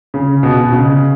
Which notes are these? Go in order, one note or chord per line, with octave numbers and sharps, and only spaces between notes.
C#3
B2
B2
C#3